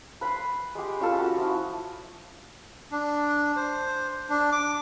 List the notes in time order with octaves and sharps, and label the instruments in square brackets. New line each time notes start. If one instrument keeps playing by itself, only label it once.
[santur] B4 B5 C6
G#3 G4
C#4 F4 A4
F#4
F3 E4
[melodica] D4
C5
D4
D6